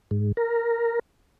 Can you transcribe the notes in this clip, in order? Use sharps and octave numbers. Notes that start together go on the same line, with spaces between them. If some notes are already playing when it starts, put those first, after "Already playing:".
G#2
A#4